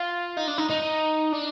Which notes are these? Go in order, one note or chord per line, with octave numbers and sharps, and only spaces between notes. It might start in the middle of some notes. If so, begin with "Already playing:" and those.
Already playing: F4
D#4
D4
D#4
D#4
D4